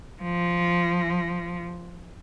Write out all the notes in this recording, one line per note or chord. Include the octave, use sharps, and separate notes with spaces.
F3